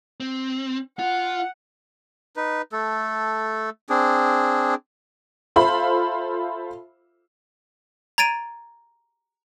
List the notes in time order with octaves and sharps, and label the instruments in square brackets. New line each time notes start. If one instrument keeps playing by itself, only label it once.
[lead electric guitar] C4
[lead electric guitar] F4 [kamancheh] F#5
[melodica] D#4 B4
A3 A4
C4 D4 G#4
[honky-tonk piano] F4 A4 C5 E5 F5 B5
[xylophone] A#5 G#6 A6 D7 D#7